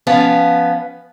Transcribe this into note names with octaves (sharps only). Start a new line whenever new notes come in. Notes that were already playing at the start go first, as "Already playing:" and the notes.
F3 B3 C#4 F5